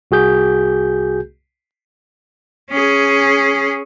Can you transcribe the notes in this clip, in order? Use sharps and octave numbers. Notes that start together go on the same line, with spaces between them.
C2 F#4 G#4 G6
C#4 G#4